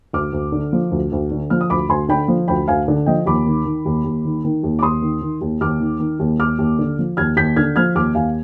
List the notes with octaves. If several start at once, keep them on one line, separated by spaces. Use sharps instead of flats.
D2 D6 F6
D2
D3
F3
D2
D2
D3
F3 F6
D#6
D2 B5 D6
D2 G#5 C6
D3 G5 B5
F3
D2 G5 B5
D2 F5 G#5
D3
F3 D#5 G5
D#2 B5 D6
D#3
D#3
D#2
D#2
D#3
D#3
D#2
D6
D#2 C6 D#6
D#3
D#3
D#2
D#2 D6 F6
D#3
D#3
D#2
D#2 D6 F6
D#2
D3
F3
D#2 F6 G#6
D#2 G6 B6
D3 F6 G#6
F3 F6 G#6
D#2 D6 F6
D#2 F5 G#5